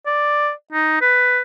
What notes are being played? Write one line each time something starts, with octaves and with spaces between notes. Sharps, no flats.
D5
D#4
B4